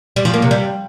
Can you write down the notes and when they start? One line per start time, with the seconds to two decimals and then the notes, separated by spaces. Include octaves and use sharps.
0.16 G3
0.25 F3
0.34 A#3
0.42 C3
0.51 G3